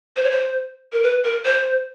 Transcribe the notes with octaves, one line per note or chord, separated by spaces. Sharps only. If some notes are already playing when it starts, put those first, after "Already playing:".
C5
C#5
C5
A#4
B4
A#4
C5